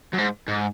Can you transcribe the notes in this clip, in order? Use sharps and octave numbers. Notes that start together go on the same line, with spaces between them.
F#2
G#2
G#2